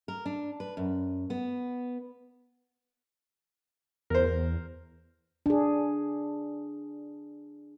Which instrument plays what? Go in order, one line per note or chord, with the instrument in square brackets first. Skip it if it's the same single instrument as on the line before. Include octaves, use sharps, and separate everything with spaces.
[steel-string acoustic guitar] A#4
D4
B4
F#2
B3
[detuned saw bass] E2 [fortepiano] A#4 C5
[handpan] D4 G#4